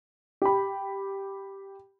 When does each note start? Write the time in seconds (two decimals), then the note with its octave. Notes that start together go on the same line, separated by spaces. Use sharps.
0.42 G4 B5